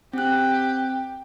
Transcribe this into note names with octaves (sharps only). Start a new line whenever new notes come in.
C4 G4 F#6